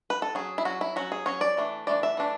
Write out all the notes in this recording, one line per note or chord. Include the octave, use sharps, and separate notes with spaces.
B4
A4
F#3 C#4 G#4
E4
F#3 C#4 F#4
E4
F#3 C#4 F#4
G#4
F#3 C#4 C#5
D5
E3 A3 D4
E3 A3 D4 D5
E5
E3 A3 D4